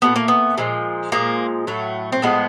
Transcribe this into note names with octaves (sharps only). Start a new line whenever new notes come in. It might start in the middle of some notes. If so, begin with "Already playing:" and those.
A#2 F#3 A3 B3
A#3
B3
A#2 F3 G#3
A#2 F3 G#3 A#3
A2 F#3 A3
C4
A2 F3 G#3 B3